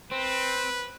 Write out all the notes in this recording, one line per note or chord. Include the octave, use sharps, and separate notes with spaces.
C4 B4